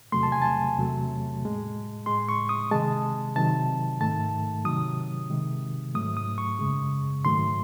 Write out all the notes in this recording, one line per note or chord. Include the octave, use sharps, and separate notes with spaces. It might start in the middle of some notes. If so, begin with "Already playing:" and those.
E2 C3 F#3 A3 C6
A5
G#5
A5
E2 C3 F#3 A3
A2 G#3
A2 G#3 C6
C#6
D#6
C3 D#3 G#3 A5
C3 D#3 F#3 A5
G#2 D#3 A3 A5
C3 D#3 F#3 D#6
C3 D#3 G#3
G#2 F#3 A3 D#6
D#6
C#6
F#2 C#3 G#3
G#2 D#3 F#3 A3 C6